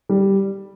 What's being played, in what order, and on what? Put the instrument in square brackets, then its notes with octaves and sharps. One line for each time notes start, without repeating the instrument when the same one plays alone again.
[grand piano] G3